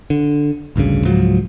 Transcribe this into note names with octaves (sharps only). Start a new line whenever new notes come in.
D3
A1 D2 G2 C#3
C#2 G#2 F3 F#3